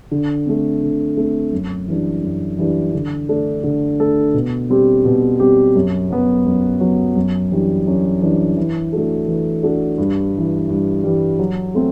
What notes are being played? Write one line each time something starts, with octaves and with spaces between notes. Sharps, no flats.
D3
A3 C4
D3
A3 C4
F#2
E3 G3 D4
F#2
E3 G3 D4
D3
A3 D4 A4
D3
A3 D4 A4
B2
G3 C4 G4
B2
G3 C4 G4
F#2
F#3 B3
F#2
F#3 B3
F#2
E3 G3 D4
F#2
E3 G3 D4
E3
A3 D4 F#4 A4
E3
A3 D4 F#4 A4
G2
E3 G3
G2
E3 G3
F#3
A3 C4